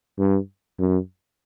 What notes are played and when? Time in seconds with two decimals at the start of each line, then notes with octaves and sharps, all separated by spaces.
0.19 G2
0.79 F#2